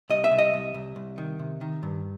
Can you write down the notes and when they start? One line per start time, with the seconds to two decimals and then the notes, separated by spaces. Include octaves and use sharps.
0.10 C2 D#5
0.24 E5
0.31 C2
0.38 D#5
0.54 C2
0.74 C2
0.96 C2
1.18 D#3
1.39 C3
1.61 D#3
1.83 G2